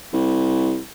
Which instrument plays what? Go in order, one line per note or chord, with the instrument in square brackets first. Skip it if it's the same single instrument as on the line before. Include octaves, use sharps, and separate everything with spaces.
[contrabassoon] C2